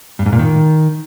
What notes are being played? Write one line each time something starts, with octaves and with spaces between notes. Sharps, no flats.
G2
G#2
A#2
D#3